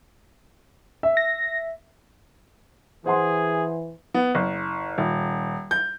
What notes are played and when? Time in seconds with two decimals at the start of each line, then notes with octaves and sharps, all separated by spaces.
1.03 E5
1.17 A#6
3.06 E3 G#4 C5 F#5 C6
4.14 B3
4.35 F#1
4.98 D#1
5.71 G6